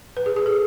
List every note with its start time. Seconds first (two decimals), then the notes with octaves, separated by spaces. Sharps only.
0.17 B4
0.26 G#4
0.36 G#4
0.46 A4